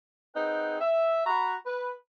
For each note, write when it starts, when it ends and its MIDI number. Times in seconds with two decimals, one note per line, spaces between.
0.35 0.76 60
0.35 0.76 63
0.35 0.76 68
0.35 0.76 71
0.35 0.76 78
0.35 0.76 79
0.81 1.24 76
1.26 1.55 66
1.26 1.55 82
1.26 1.55 83
1.66 1.93 71